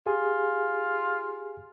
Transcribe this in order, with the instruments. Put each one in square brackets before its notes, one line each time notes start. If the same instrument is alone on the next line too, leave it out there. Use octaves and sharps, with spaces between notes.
[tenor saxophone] F4 [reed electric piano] G4 G#4 G#5